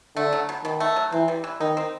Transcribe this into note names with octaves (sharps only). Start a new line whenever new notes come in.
D3 A3
F#3
B2
B2 D#3
A3
F#3
E3 C4
G3
E3
D#3 D#4
C4